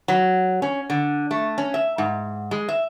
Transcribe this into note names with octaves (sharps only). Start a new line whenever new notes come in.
F#3
C#4
D3
A3
C#4
E5
G#2
G#3
E5